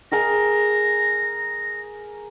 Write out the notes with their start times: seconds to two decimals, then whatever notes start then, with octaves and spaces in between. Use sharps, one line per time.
0.12 G#4 A#4 G#5 A#6